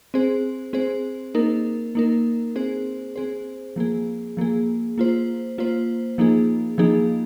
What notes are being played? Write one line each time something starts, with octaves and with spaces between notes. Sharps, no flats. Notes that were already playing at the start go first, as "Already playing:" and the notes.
C4 G#4 C5
C4 G#4 C5
A#3 D#4 A#4
A#3 D#4 A#4
C4 G#4 C5
C4 G#4 C5
F3 A#3 G#4
F3 A#3 G#4
A#3 F4 C5
A#3 F4 C5
F3 A#3 D#4 G#4
F3 A#3 D#4 G#4